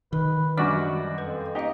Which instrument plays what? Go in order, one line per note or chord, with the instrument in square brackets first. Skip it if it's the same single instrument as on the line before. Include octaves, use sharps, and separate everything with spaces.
[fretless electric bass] D#3 [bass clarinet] B4
[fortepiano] F#2 F#4 D5 [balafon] G3 D4 D6 [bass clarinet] G#3
[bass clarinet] F2 [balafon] B4
[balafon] A#3 F5 [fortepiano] D#4 G4